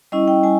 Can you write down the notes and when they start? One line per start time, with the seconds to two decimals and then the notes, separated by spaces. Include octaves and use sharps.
0.12 G3 C#4 E4 D#5
0.28 G5
0.43 G3 G#5